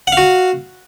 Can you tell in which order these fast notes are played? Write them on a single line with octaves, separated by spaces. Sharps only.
F#5 F5 F#4